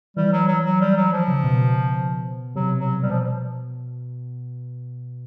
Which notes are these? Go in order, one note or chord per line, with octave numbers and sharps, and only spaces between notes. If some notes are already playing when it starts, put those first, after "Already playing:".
E3 G3
F#3
F#3
F#3
G3
F#3
F3
C#3
B2
C3 F#3
F#3
B2 G3
F3